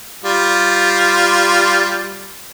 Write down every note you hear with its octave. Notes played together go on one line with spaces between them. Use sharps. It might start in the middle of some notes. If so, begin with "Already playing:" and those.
G3 F4